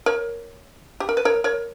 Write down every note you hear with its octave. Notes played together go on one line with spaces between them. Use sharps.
A#4 C#5
G4
A#4
B4
A#4 C#5
A#4 C#5